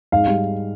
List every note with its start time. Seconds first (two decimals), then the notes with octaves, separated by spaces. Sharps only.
0.12 G#2 F5
0.27 G3